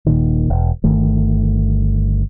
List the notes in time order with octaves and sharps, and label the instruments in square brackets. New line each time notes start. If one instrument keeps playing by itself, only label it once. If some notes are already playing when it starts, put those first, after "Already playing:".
[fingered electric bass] D#1 A#2 D#3
E1
G1 D#3 A3